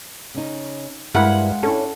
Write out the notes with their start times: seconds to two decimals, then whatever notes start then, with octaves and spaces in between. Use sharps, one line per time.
0.34 C#3 C#4 D#4
1.15 G2 G#3 E4 A#4 C5 F5 F#5 B5
1.63 C#4 D4 E4 A4